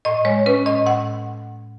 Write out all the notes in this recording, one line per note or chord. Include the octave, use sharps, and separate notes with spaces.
A2 D#5
G#3 C#5
C#4 B4
A2 D#5
A2 F#5